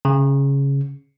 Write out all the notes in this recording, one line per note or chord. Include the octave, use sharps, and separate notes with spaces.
C#3